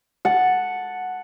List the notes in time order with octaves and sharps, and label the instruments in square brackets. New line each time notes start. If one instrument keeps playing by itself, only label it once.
[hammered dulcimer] F#5 A5